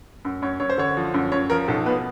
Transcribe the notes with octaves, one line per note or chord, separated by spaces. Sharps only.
F#2
F#2 C#5
F#2 C#5
C5
D3 C#5
F3
F#2
F#2 C#5
F3 A#4
B1 A4
B2 B4